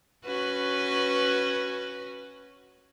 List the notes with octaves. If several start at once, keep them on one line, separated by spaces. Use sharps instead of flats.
C#4 F#4 B4